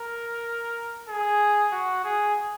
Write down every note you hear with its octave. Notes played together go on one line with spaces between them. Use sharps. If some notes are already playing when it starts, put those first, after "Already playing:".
Already playing: A#4
G#4
F#4
G#4